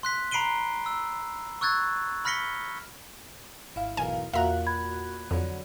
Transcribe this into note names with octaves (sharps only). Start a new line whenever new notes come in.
C6 F#6 B6
A#5 B5 C7 D7 D#7 G7
E6
C#6 E6 F#6 G#6 A6
B5 F6 A#6 B6 C#7 G7
G#1 E4 F5
B1 E2 A#4 G#5
E2 A#2 F#4 A#4 E5 F5 A#5 F#6
B5 G#6
F2 D3 F#3